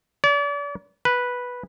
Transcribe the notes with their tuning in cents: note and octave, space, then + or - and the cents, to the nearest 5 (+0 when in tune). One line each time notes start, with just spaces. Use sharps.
D5 -40
B4 -5